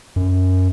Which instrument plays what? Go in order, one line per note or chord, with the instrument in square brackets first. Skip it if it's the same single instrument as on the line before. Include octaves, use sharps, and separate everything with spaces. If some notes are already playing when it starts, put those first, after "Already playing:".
[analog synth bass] F#2